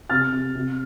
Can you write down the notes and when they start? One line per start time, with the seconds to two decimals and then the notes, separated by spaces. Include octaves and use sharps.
0.10 C3 F6 A6
0.33 C3
0.55 C3